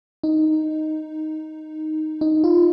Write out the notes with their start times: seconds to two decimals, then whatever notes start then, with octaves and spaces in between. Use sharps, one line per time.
0.24 D#4
2.21 D#4
2.44 F4